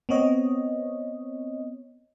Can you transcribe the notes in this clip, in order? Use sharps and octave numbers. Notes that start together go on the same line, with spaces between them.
B3 C4 C#5 D#5